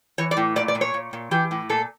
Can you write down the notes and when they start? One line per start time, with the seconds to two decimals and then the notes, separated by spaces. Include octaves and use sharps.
0.18 E3 C#5
0.31 D5
0.37 A2
0.56 A#2 D5
0.68 D5
0.75 A#2
0.81 C#5
0.94 A#2
1.13 A#2
1.31 E3 G4
1.51 A2
1.69 A#2 A4